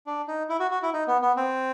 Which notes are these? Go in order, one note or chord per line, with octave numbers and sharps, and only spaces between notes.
D4
D#4
E4
F#4
F#4
E4
D#4
B3
B3
C4